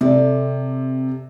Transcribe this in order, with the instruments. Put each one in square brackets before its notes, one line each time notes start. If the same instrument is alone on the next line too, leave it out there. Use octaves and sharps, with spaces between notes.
[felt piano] C3 [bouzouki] A4 D5